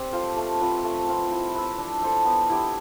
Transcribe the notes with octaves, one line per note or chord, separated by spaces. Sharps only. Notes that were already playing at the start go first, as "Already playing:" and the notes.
Already playing: C4 G4 D5
F4 A4 C5
A3
C4 F4 B4
A3
C4 F4 B4
E4
B4 E5
D4
A4 C5 E5
B3
E4 G4